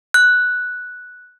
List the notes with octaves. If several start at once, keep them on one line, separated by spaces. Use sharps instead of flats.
F#6